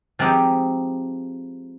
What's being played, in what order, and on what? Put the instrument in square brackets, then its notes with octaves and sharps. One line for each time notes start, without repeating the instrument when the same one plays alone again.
[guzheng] F3 G#3 C4 D#4 G4